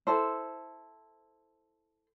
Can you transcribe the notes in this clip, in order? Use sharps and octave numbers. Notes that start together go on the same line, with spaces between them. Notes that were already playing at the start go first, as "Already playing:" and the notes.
E4 A4 C5